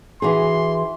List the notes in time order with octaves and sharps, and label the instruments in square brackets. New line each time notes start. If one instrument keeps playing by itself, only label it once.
[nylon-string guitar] E3 F#4 G#4 [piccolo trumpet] C6